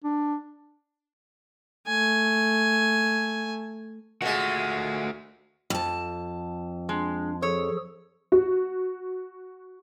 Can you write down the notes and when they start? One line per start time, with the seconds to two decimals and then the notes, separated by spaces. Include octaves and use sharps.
0.04 D4
1.87 A3 G#5
4.22 A#2 G#3 A3 F#4 F#5
5.70 F2 A5
6.89 G#3 D4
7.42 F3 G#4 A4 C#5
8.32 F#4